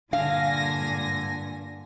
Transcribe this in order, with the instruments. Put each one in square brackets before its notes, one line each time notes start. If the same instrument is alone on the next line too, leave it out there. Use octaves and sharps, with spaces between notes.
[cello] G2 A#2 [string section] D3 G#5 A#6 [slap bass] D4 [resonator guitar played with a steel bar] F5